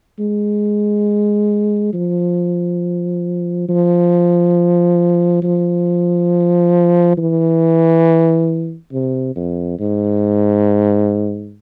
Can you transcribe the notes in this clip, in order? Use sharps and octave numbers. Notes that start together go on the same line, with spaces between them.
G#3
F3
F3
F3
E3
C3
F2
G#2